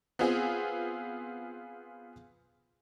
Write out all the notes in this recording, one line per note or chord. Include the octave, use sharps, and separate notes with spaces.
B3 C4 F4 G#4